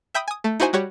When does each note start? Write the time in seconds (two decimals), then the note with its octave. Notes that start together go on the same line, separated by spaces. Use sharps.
0.14 E5 G5 B5 D#6
0.28 G#5 D#6
0.44 A3
0.60 D#4 E4 F#4 C5 G#5
0.73 G3 F#4 G4 C#5